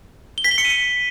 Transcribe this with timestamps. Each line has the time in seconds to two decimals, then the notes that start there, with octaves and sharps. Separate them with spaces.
0.38 G7
0.44 B6
0.51 G7
0.58 C#7
0.65 D#7